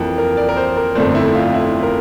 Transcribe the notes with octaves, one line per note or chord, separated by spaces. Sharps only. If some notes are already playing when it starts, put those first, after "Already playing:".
Already playing: F2 E3 A#3
A#4
D5
A#4
C5
A#4
G1 F2 D3 A3 C4 D4
E4
F4
E4
A#4